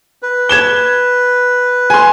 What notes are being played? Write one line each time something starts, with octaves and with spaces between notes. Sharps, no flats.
B4
G#6 E7 G7
G#5 C6